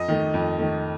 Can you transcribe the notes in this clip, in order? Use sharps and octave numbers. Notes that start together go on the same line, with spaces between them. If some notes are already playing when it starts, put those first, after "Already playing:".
Already playing: F2 D#5
D#3 A3
F2
D#3 A3